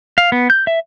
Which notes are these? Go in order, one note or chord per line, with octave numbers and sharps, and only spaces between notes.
F5
B3
G6
E5